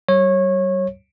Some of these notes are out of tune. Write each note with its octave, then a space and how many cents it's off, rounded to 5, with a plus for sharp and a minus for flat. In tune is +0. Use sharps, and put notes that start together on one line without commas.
G3 -40 C#5 -20